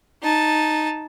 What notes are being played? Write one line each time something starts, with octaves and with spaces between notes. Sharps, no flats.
D#4 A5